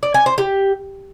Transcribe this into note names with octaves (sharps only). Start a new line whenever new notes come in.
D5
G#5
C5
G4